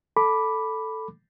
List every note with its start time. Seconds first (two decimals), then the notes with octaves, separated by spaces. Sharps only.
0.17 A4 B5 D6